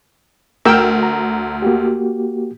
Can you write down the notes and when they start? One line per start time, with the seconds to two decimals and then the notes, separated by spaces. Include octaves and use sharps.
0.65 D2 A#4 G5 E6
1.03 A#5
1.62 A#3 F#4 G4